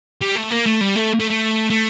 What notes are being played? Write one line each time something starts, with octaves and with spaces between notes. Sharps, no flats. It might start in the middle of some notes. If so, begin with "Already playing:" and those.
G3
A3
A#3
A3
G3
A3
A3
A3
A3